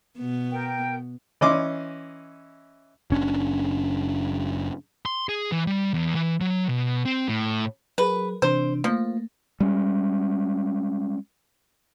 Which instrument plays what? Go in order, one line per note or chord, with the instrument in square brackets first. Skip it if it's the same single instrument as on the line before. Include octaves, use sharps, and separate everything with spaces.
[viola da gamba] B2 B3
[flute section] A#4 G5
[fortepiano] E3 C#4 D#5 C6 D6
[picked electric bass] F#1 C#4 D4
[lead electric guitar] C6
G#4
E3
G3
E2
E3
F#3
B2
C4
A2
[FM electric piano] F#3 G#4 A#4 [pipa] B4
[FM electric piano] C3 E3 D4 [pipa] C5
[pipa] F3 [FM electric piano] A3 A#3
[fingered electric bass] G3 G#3 C#4